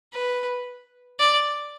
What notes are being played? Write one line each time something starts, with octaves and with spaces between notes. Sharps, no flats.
B4
D5